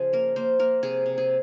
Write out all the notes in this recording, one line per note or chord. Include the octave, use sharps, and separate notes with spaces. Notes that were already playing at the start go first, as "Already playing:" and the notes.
Already playing: C#3 F3 G#4
A#3 A#4
A#3 C5
A#3 A#4
C3 G#4
C3
G#4